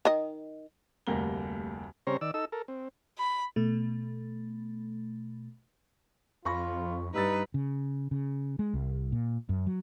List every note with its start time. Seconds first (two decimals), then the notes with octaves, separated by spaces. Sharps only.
0.05 D#3 D#5
1.07 F1 D2 G3 A#3 A#5 G7
2.07 C#3 G3 C4 C5 C#5 A#5
2.21 D#3 D5 E6
2.34 D#4 A4 E6
2.52 A4 A#4
2.68 C4
3.18 B5
3.56 B2 A3
6.45 F2 F4 B5 C#6 A#6
7.14 G2 G3 D#4 B4 E6 A6
7.54 C#3
8.11 C#3
8.59 G#3
8.74 C2
9.12 A#2
9.49 F#2
9.67 F#3